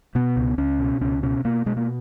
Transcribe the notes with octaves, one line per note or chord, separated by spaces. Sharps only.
B2 B3
C#2
C#2 C#4
B2
C#2 C#4
B2 C#4
B2 A#3
B2 G#3
A#3